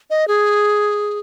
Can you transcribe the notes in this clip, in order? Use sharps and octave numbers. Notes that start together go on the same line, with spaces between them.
D#5
G#4